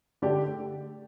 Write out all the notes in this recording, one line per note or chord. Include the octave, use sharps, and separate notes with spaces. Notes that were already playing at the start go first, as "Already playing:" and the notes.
D3 A3 G4 D5